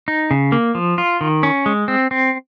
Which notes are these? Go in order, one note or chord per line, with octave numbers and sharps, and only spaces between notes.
D#4
C#3
A#3
F3
F4
D#3
C#4
G#3
C4
C4